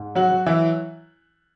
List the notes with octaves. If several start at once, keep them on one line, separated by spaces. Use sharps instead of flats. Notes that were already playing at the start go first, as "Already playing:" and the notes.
Already playing: G#2
F#3 F#4
F#3
E3 E4